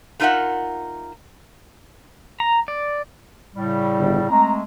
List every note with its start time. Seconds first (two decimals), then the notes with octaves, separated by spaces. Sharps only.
0.20 A3 D#4 F4 A#4 E5 F#5
2.40 A#5
2.68 D5
3.55 A2 C#3 G3
3.98 G1
4.30 G#3 A3 C4 A#5